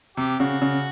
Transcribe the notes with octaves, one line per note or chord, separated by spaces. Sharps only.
C3 G4
C#3 F#4
C#3